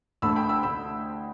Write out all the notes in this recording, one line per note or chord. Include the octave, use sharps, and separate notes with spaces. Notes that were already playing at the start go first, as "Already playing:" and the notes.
D2 D3 A3 B5 E6
G5 B5
B5 E6
D3 A3 B5 E6